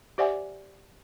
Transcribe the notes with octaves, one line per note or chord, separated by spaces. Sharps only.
G4 C5 D5 E5 F#5 G#5